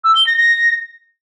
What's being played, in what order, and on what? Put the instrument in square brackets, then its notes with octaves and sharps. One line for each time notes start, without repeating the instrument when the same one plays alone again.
[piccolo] E6
G7
A#6
A#6